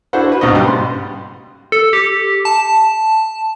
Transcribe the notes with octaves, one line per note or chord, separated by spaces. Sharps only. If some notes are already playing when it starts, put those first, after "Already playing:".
D4 E4 F#4 A4 C5 F#5
F#4 B4
C#2 G#2 B2 D3 F#4 D#5
C#3 G3 B3
C6
A4
G4
A5